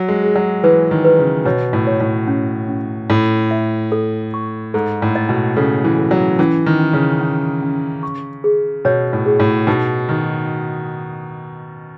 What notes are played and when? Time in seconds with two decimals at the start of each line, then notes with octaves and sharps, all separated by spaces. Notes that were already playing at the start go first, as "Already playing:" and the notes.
Already playing: F#3
0.08 G#3
0.23 G#4
0.36 F#3
0.64 E3 B4
0.91 D#3
1.04 B4
1.19 C#3
1.45 B2 C#5
1.73 A2
1.87 C#5
2.00 A2
2.28 C#4
2.69 C#4
3.10 A2 A4
3.51 E5
3.92 A4
4.34 C#6
4.74 G#2 A4
5.02 A2
5.15 D#5
5.29 B2
5.56 C#3 A4
5.84 E3
5.98 A4
6.11 F#3
6.39 E3 C#4
6.66 D#3
6.80 C#4
6.93 C#3
7.21 C#4
7.62 C#4
8.03 C#6
8.44 G#4
8.85 B2 C#5
9.13 A2
9.26 G#4
9.40 A2
9.67 B2 D#4
10.09 D#3 F#4